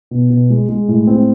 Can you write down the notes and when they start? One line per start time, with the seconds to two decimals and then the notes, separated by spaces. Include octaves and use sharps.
0.11 B2
0.30 B2
0.50 G#3
0.69 G#3
0.88 A2
1.07 C4